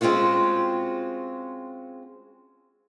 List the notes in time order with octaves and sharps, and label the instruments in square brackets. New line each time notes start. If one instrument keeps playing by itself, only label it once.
[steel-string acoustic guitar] G#3 C4 C#4 F4 F#4